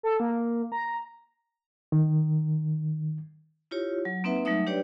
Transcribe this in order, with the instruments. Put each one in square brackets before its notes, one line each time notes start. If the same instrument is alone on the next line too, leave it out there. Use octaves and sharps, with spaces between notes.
[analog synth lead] A4
A#3
A#5
[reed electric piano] D#3
[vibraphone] E4 F4 G4 C#5
F#3
A#3 C4 D#4 B4 E5 F#5
F#3 G3 A3 D#4 E5 D#6
D4 G4 B4 C#5 D5 G5